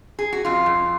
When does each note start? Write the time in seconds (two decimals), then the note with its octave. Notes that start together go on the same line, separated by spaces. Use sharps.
0.19 G#4
0.33 F#4
0.45 F2 F4
0.66 F2